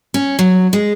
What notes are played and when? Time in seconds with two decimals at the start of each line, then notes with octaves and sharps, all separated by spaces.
0.14 C#4
0.39 F#3
0.73 G#3